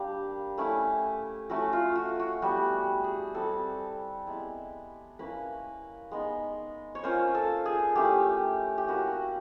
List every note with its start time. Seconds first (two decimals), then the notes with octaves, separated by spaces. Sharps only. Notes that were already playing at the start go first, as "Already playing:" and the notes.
Already playing: G3 A#3 D4 G4
0.58 A3 C#4 E4
1.50 A3 C#4 E4 F#4
1.73 F4
1.96 F#4
2.19 F#4
2.42 G3 B3 E4 F#4
3.04 G#4
3.34 G3 C4 E4 A4
4.27 G#3 B3 E4
5.19 A#3 C#4 E4 B4
6.11 G#3 B3 D#4
6.95 C#5
7.04 A#3 C#4 F4 C5
7.35 A4
7.66 G#4
7.95 A3 C#4 E4 G4
8.78 G4
8.88 A#3 C#4 E4 F#4